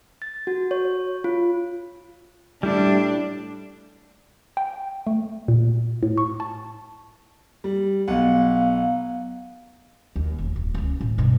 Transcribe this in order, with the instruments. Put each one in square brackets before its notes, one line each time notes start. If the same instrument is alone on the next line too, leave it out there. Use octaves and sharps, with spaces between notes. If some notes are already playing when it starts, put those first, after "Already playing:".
[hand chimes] A6
F#4
C#5
F4
[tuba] A2 [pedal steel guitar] G3 E4 [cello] D4
[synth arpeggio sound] G5
A3
A#2
A2
C#6
A5
[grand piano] G3
[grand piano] B1 F#5 [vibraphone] B3 F5
[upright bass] D#2
F1
D1
C#2 C#4
A2
G2 B2